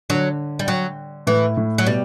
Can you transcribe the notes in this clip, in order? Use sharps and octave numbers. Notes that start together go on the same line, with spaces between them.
D3 F#3
G3
F#3
A2 E3
A2
F#3
B2 G3